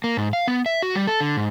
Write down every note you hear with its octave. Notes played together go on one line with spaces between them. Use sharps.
A#3
G#2
F5
B3
E5
F#4
G3
A4
D3
G#2